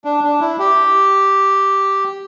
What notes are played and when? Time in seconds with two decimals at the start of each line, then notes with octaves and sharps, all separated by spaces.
0.05 D4
0.24 D4
0.40 E4
0.59 G4